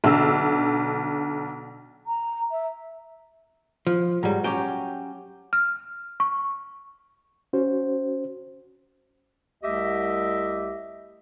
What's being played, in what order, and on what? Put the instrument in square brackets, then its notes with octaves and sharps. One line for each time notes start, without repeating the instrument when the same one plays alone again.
[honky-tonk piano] B1 D3 E6
[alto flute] A#5
E5
[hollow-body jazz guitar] F3
[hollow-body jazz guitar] G#2 G3 [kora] F#3
[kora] F#3 C#4 G4 [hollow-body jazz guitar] G5
[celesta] F6
C#6
[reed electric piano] C#4 F#4 C5
[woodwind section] C2 A3 G4 D#5 E5